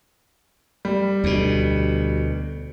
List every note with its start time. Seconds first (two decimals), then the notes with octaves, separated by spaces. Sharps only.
0.85 G3
1.24 D2 B2